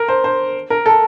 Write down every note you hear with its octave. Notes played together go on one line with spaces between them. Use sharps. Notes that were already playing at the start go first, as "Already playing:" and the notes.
Already playing: A#4
C5
C5
A#4
A4